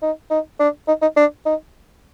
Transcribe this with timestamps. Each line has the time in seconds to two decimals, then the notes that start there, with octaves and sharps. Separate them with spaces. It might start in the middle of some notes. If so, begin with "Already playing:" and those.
0.02 D#4
0.30 D#4
0.60 D4
0.88 D#4
1.02 D#4
1.17 D4
1.46 D#4